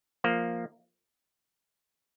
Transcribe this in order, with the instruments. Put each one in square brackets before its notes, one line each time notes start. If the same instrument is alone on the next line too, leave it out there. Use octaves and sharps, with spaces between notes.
[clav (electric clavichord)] F3 A#3